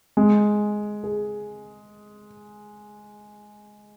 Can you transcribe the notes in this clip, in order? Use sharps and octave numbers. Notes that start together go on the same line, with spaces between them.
G#3
G#4